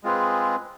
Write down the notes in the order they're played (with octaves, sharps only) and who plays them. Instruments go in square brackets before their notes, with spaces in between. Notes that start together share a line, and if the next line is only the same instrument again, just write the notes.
[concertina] G#3 C4 F4 G#4 B4